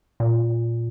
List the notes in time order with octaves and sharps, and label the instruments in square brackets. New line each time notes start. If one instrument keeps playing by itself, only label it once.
[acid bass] A#2